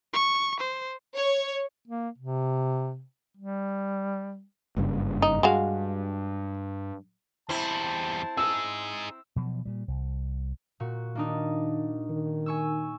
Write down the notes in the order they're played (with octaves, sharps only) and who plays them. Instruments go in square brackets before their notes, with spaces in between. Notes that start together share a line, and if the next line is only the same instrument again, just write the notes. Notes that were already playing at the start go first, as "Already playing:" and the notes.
[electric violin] C#6
C5
[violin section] C#5
[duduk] A#3
C3
G3
[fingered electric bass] F#1 G2 C#3
[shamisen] D#4
[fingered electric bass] G2 [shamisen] G#3 F#4 F5
[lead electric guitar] E2 G3 [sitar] C4 E4 [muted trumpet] A5
[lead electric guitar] D#4 G#4 [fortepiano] E6
[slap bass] B2 F3 F#3
A#2 G3
C2
[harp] A#2 F#4
[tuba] D#3 [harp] A#3 D4 D#4
[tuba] D#3
[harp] G#5 C#6 E6